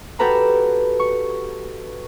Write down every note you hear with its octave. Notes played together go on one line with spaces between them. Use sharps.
F#4 G4 A4 B4 A#5 B5
C#6